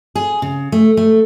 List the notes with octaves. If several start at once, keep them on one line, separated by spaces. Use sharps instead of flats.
G#4
C#3
A3
A3